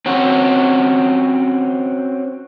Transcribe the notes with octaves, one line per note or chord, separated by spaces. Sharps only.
C4 C#4 F#4